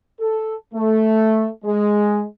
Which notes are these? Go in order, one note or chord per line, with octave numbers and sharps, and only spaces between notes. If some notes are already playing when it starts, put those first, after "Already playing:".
A4
A3
G#3